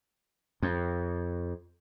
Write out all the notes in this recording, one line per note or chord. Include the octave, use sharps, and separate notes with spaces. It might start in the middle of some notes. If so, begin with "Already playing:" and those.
F2